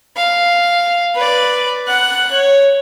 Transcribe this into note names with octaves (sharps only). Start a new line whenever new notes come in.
F5
B4 D5
F#5 F#6
C#5